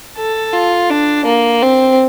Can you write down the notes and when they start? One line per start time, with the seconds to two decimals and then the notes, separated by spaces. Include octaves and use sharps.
0.18 A4
0.54 F4
0.90 D4
1.26 A#3
1.62 C4